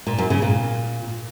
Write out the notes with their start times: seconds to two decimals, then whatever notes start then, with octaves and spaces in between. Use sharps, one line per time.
0.07 A#2
0.18 F#2
0.30 C#3
0.42 A#2